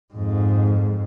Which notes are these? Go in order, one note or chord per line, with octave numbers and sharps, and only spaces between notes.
F2 G#2